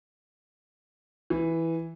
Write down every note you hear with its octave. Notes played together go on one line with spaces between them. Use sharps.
E3